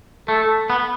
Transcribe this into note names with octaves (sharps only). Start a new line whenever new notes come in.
A3 A4
B3